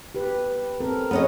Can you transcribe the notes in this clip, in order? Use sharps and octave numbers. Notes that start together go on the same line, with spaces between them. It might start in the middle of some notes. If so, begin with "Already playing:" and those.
G4 B4
C4 A4 A#4
F3 B3 C#4 B4 C#5 D#5